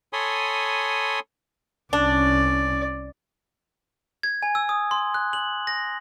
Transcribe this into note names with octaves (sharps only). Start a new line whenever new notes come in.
A4 C#5 G#5 B5 C6 D#6
C2 C#4 D4 D5
G#6
G#5
E6
D#6
C6
F#6
F#7
A#6